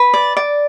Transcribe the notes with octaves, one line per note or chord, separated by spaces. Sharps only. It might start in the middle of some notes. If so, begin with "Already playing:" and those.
Already playing: B4
D5
D5